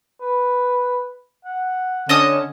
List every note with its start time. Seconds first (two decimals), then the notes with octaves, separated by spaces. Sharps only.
0.21 B4
1.45 F#5
2.09 D3 C#4 D#5 A5 D#6